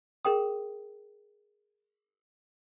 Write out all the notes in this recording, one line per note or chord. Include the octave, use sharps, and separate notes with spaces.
G#4 A#4 G5 D#6